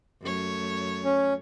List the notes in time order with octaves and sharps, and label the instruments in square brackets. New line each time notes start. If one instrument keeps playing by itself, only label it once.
[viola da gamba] F#2 A3 C#5
[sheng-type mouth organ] C#4